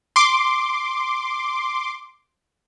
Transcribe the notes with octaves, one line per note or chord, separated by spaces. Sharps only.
C6 D6